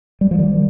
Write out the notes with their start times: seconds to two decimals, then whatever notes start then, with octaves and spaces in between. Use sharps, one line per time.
0.21 G3
0.31 F3
0.39 D#3 G3